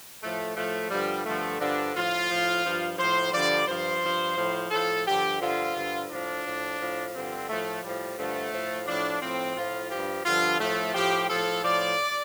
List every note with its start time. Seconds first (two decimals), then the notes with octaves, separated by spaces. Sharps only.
0.22 A2 F3 A3
0.56 A2 F3 A3
0.90 G2 D3 F3 G3
1.25 G2 D3 F3 A3
1.60 G2 D3 F3 D4
1.95 A2 F3 F4
2.30 A2 F3
2.64 G2 F3
2.98 A2 F3 C5
3.33 G2 D3 F3 D5
3.67 G2 F3 C5
4.02 G2 F3
4.37 A2 F3
4.71 A2 F3 A4
5.06 G2 D3 F3 G4
5.41 G2 D3 F3 F4
5.76 G2 D3 F3
6.09 A2 F3 D4
6.44 A2 F3
6.79 A2 F3
7.14 G2 D3 F3 C4
7.48 A2 F3 A3
7.83 A2 F3 G3
8.17 G2 D3 F3 A3
8.52 A2 F3
8.87 A2 F3 D4
9.21 A2 F3 C4
9.55 A2 F3 F4
9.90 G2 F3 G4
10.25 G2 D3 F3 F4
10.59 A2 F3 A3
10.94 A2 F3 G4
11.29 A2 F3 A4
11.64 A2 F3 D5